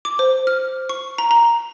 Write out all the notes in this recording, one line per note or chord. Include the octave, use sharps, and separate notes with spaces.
D6
C5
F6
C#6
A#5
A#5